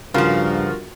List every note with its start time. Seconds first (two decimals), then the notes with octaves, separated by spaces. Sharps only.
0.14 G2 C#3 F3 F4 F#4 A#4